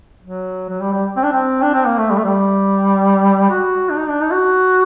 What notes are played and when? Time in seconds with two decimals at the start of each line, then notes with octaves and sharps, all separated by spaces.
0.22 F#3
0.69 F#3
0.81 G3
0.93 G3
1.16 C4
1.23 D4
1.32 C4
1.62 D4
1.74 C4
1.86 A#3
1.98 A3
2.10 G3
2.18 A3
2.24 G3
3.50 F#4
3.90 D4
3.97 D#4
4.08 D4
4.21 D#4
4.31 F#4